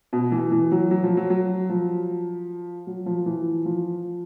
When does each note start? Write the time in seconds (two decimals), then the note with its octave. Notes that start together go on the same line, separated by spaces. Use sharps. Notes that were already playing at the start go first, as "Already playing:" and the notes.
0.13 B2
0.32 E3
0.52 E3
0.72 F#3
0.91 F#3
1.03 F3
1.17 F#3
1.30 F#3
1.70 F3
2.87 F#3
3.06 F3
3.26 E3
3.66 F3